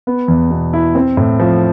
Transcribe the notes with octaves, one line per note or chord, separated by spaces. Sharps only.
B3
E2
B2
E4
C4
A2
F3